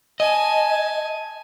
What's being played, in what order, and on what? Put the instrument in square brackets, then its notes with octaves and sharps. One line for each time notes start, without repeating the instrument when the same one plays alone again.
[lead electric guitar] D#5 [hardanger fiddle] G#5 A5